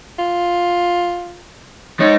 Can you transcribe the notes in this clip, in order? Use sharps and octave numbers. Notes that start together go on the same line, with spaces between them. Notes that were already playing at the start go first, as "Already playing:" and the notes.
F4
G#3 D#4 C#5